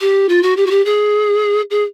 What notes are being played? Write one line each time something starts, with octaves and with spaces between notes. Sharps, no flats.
G4
F4
F#4
G4
F#4
G4
G#4
G#4